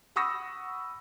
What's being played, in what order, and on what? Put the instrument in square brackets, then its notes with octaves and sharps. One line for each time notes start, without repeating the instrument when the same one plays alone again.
[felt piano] F#5 B5 C#6 D#6 E6 A#6